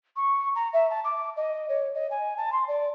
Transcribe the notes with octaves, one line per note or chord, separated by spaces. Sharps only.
C#6
A#5
E5
A5
D6
D#5
C#5
D#5
G#5
A5
C6
D5